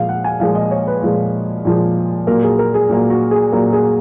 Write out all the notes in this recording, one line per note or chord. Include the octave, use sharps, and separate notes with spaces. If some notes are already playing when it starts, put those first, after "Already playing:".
Already playing: A#2 F3 G#3 F5
F#5
G#5
A#2 F3 G#3 F5
D#5
C#5
B4
A#2 F3 G#3
A#2 F3 G#3
A#2 F#3 A#3 A#4
G#4
A#4
G#4
A#2 F#3 A#3
F#4
G#4
A#2 F#3 A#3 A#4
G#4